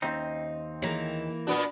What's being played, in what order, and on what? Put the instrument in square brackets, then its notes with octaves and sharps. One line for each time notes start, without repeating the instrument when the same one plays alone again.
[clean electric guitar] D#2 C4 D#4 [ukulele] C#4 E5
[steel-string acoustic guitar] E3 A#3 [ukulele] G#4 A#4 C#5
[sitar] A#2 B3 D4 [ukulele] F#4